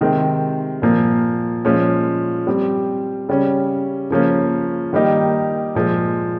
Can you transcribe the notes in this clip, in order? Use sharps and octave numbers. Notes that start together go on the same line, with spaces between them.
C3 D#3 G#3 C4
A#2 F3 A#3
A#2 F3 G#3 C#4
G3 C4 G4
C#3 G3 C#4
C#3 F3 A#3 C#4
D#3 G3 A#3 D#4 G4
A#2 F3 G#3